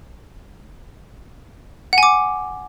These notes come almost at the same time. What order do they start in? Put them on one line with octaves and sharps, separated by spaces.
F#5 G#5 D6